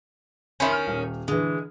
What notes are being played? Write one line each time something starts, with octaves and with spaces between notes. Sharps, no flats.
D#3 C#4 E5 B5 C6
F6
D#1
D3 E3 G#3